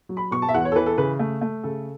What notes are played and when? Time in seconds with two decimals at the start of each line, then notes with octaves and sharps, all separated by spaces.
0.09 F#3
0.17 B5
0.31 B2 C#6
0.42 A5
0.49 E5
0.54 E2 F#5
0.65 C#5
0.72 A4
0.75 E3 B4
0.86 A4
0.98 C#3 B4
1.19 A3
1.41 A3
1.63 C#3 A4